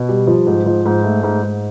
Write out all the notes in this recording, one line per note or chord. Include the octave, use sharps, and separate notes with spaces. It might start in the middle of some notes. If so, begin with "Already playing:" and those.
Already playing: B2
G3
F3
G#2
F3
G#2
A3
G#2
G#2